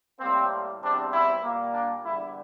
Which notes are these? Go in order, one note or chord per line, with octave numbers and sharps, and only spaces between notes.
A2 G3 A#3 C4
E2 C3 G3 C4 D4
E4
A#2 G3 A#3
D4
E2 D3 G3 E4